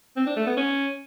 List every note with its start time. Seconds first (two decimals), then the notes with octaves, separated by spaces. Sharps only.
0.17 C4
0.27 D4
0.37 A3
0.47 B3
0.57 C#4